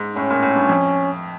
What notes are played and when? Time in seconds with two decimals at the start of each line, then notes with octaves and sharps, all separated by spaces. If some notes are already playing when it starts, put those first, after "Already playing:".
Already playing: G#2
0.16 A2 C#4
0.30 A#2
0.43 A2
0.56 G2
0.69 F2